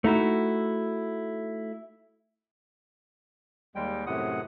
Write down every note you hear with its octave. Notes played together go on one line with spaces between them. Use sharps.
A3 D#4 E4 F#4
D#2 G3 G#3 G5
F#2 A2 C3 F#5 D#6